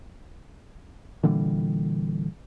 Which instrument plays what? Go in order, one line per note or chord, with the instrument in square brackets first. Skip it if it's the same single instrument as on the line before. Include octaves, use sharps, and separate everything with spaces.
[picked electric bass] A#2 D3 E3 G3